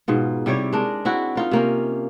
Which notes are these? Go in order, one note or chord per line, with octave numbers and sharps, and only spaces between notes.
G#2 B2 F4
C3 G3 E4 C#5
G#3 D4 A#4
C4 E4 F#4
D#4 F4 A#4
C3 A#3 C#4